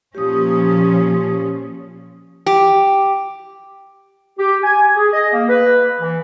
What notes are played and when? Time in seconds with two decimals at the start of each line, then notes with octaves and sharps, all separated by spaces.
0.15 A#2 F3 C#4 G4 D#6
2.46 G4
4.38 G4
4.63 G#5
4.96 G#4
5.13 D#5
5.33 A#3
5.49 B4
6.01 E3